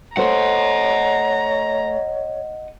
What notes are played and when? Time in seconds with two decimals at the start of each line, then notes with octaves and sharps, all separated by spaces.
0.17 A3 C5 C#5 D#5 F#5 A#5